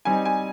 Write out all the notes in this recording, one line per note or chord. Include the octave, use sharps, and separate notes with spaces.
G3 C4 D#4 G#5
G#5